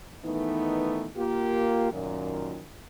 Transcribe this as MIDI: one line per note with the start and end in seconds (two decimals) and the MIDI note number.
0.24 1.09 51
0.24 1.09 52
0.24 1.09 57
0.24 1.09 59
0.24 1.09 63
1.17 1.87 58
1.17 1.87 65
1.17 1.87 67
1.92 2.61 42
1.92 2.61 46
1.92 2.61 51